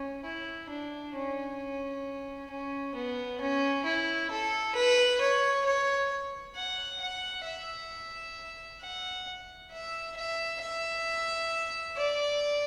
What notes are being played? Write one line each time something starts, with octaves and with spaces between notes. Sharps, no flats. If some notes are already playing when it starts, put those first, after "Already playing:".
Already playing: C#4
E4
D4
C#4
C#4
B3
C#4
E4
A4
B4
C#5
C#5
F#5
F#5
E5
F#5
E5
E5
E5
D5